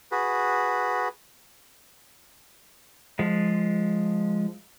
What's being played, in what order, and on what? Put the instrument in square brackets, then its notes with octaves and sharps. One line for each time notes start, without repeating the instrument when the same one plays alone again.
[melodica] F#4 G#4 B4
[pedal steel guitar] F3 G#3